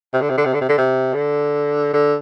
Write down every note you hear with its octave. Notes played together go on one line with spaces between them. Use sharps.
C3
D3
C3
D3
C3
D3
C3
D3
C3
D3
D3